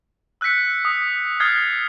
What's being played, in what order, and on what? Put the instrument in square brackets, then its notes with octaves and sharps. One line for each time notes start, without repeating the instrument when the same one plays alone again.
[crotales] E6 F#6 G6 B6 C#7
D#6
D#6 F6 F#6 G#6 A6 C7